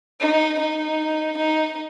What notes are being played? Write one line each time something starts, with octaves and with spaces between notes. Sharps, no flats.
D#4
D#4
D#4